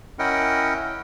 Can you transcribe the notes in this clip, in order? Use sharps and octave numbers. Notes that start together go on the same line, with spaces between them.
C#4 E4 A#4 D#5 F#5 G5